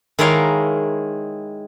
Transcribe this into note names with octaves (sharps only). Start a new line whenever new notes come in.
D#3 G#3 E4 A#4 C#5 F5